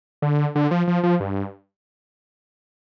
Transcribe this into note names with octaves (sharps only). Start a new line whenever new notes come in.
D3
D3
F3
F3
F3
G2